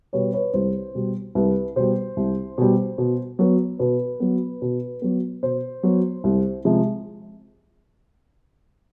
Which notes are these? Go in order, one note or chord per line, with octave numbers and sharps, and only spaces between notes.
B2 G3 B4 C#5
B4 C#5
C2 C5
B2 G3
C2 B4
B2 G3 C5
C2
B2 G3
B2
F#3 B3
B2 B4
F#3 B3
B2
F#3 B3
B2 C5
F#3 B3
C2
C3 F3 G#3